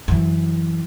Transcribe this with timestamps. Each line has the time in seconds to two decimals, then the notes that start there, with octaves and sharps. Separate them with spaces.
0.08 F#2 E3